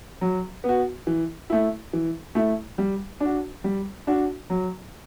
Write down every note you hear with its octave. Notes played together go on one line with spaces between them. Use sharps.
F#3
B3 F#4
E3
A3 E4
E3
A3 E4
G3
D4 F#4
G3
D4 F#4
F#3